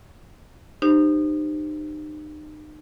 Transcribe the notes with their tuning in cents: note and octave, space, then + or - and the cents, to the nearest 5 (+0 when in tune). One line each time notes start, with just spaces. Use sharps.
D#4 -35 G4 +0 C5 +0